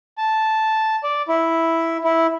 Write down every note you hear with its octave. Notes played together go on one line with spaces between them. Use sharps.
A5
D5
E4
E4